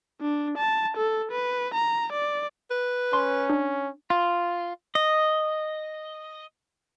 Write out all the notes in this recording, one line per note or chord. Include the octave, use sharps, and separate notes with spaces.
D4
A5
A4
B4
A#5
D5
B4
C#4 C6
D4
F4
D#5